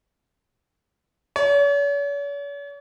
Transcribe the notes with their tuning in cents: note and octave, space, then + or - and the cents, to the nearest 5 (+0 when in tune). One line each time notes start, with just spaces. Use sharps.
C#5 +45